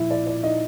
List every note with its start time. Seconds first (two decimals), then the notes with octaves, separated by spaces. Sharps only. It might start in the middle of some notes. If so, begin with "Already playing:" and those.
Already playing: A#2 F3 E4 E5
0.11 D5
0.27 D5
0.43 D#4 D#5